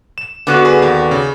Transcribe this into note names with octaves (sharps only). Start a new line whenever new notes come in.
E7
D3 B3 F#4
G#4 B4
D#2
C#3